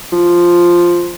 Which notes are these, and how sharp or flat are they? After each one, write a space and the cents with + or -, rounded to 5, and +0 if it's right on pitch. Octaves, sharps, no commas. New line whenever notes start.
F3 +0